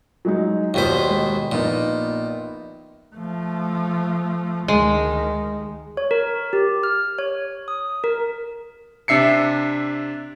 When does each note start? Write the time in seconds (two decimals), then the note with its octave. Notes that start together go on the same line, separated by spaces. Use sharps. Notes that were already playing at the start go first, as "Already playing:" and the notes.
0.25 F#3 G#3 D#4
0.74 D#2 B2 F4 C5 D5 B6
1.09 G#3
1.52 A#1 A#2 B3 D#4
3.15 F3 A3
4.68 D2 D#3 G#3
5.97 C#5
6.11 A#4
6.53 G4
6.83 F6
7.18 C#5
7.68 D#6
8.04 A#4
9.08 C3 D4 E5 C7 C#7